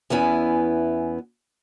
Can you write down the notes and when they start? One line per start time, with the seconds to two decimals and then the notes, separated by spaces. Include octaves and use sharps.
0.10 E2 B3 C#4 E4 G#5